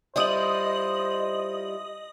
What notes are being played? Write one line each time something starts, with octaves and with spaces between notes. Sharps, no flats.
G3 E4 F4 C5 D#5 D#6 F#7